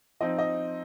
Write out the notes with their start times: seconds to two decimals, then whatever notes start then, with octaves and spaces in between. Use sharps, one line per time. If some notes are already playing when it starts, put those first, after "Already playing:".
0.20 F3 C4 D#4 D#5
0.39 D#5